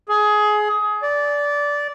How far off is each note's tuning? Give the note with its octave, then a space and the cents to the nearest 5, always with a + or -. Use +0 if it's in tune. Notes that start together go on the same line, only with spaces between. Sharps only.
G#4 +20
D5 -15